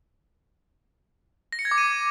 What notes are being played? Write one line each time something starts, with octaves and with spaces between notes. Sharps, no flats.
A#6
C#7
G#6
D6
D#7